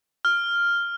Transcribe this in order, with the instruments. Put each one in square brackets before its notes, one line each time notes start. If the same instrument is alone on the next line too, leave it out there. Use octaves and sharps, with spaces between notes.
[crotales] F6